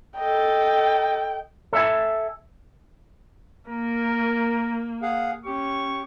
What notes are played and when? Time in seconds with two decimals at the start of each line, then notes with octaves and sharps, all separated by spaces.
0.18 A4 D#5 G5
1.73 A4 E5 G#5
3.68 A#3 A#4
5.02 G#4 F5 F#5
5.45 C#4 G4 C#6